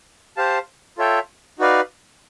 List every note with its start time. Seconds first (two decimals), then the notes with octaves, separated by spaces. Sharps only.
0.37 G4 C5 F5 A5
0.98 F4 A4 C#5 E5 G5
1.59 D#4 F#4 B4 D5 F5